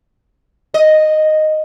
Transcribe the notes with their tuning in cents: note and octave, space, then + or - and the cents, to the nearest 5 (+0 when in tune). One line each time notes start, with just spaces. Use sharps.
D#5 -5